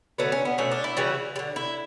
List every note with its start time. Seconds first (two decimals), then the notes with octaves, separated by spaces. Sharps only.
0.18 D3 F#3 A3 B3
0.32 C#4
0.45 B3
0.58 B2 A3 C#4
0.71 D4
0.84 E4
0.97 C#3 E3 G3 F#4
1.36 G3
1.39 D3
1.56 E4